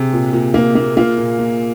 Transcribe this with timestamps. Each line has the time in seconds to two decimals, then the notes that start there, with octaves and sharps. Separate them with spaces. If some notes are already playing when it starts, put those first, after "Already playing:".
Already playing: C3 G#4
0.13 A#2
0.33 A#2
0.54 A#3
0.75 A#3
0.97 A#3 F4
1.18 A#2
1.39 A#2